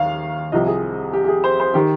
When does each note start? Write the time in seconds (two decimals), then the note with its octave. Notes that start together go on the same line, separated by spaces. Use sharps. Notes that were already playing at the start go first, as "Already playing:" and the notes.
Already playing: D#2 D#3 F5
0.52 C2 C3 F3 D#5
0.67 G#4
1.13 G4
1.24 G4
1.28 G#4
1.44 C5
1.60 C5
1.74 D#3 G4